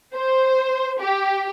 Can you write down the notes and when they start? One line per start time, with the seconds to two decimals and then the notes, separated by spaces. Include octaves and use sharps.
0.13 C5
1.00 G4